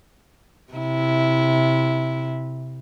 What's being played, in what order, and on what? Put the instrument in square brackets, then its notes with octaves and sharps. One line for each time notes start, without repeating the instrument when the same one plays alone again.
[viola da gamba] C3 E4